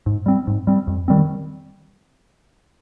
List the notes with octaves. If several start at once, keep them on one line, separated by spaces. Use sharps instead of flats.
G#2
G3 C4
G#2
G3 C4
F2
D#3 G3 C4